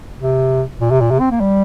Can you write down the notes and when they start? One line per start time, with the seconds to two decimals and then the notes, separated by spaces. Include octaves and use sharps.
0.20 C3
0.81 A#2
0.91 C3
1.01 A#2
1.10 C3
1.20 C4
1.31 A#3
1.40 G3